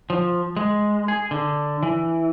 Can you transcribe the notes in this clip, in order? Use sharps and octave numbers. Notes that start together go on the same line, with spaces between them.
F3
G#3
G#4
D3
E3